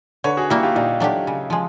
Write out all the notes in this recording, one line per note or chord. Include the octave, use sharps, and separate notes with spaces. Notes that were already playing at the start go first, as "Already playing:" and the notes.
D3 B4 C#5
F#4 G#4
G3 A#3 E4 F#4
F4 G4
A#2 D#4 F4
F#3 A3 D4 G4
C#3
F3 G#3